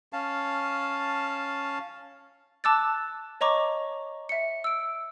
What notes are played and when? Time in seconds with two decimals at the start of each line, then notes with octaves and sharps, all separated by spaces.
0.13 C#4 F5 A5
2.64 A5 D6 E6 F#6 A6
3.41 C#5 D#5 A#5 C#6 D6
4.29 E5 C#7
4.64 E6 D7